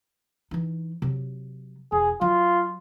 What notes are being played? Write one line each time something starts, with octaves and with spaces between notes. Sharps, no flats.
E3 D#4
C3 F#3
E1 G#4
F#3 F4